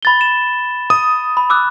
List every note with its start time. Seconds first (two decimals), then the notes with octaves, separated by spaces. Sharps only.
0.03 B5 A6 G7
0.21 E7
0.90 D#6
1.37 B5
1.50 D6 E6 F#6